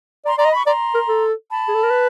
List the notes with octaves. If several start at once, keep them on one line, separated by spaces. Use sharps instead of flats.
D5 A#5 C6
D5 A#5 C6
D#5
B5 C#6
D5 A#5 C6
A#4
A4
A5 B5
G#4
A4
A#4
B4